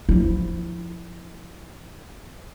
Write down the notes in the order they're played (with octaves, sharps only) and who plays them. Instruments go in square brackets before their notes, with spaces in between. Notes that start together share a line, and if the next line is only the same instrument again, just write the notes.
[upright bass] F3 E4